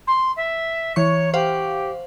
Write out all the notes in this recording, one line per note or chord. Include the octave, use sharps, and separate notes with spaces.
C6
E5
E3 C#5 C#6
G4 C5 F5 F#5